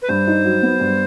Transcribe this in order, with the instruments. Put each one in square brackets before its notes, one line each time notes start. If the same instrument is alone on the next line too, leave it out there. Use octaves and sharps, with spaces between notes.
[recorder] B4
[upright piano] G2 [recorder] C5
[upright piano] D#4
F#3
B3
G2